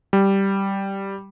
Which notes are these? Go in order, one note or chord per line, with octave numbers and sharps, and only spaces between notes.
G3